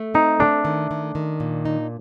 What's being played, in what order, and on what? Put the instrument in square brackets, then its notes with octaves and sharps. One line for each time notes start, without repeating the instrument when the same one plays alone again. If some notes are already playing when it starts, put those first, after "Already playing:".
Already playing: [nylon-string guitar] A3
[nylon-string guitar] C4 [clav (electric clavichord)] D#4
[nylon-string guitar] A3 [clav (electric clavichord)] D4
[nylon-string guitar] D#3
D#3
D#3
A#2
D#4